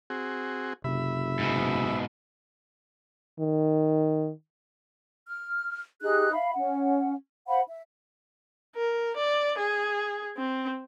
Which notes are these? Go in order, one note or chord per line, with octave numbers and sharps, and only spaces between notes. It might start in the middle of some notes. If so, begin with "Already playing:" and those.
C4 F#4 G#4
F#1 C3 E5 B5
G#2 B2
D#3
F6
D#4 G4 G#4 F#6
E5 F5 B5
C#4 F#5
C5 F5 F#5 B5
E5
A#4
D5
G#4
C4